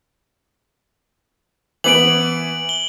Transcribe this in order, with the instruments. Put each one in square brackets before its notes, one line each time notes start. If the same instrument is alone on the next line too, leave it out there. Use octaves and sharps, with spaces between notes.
[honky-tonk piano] E3 B3 [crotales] D7 F#7
[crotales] G7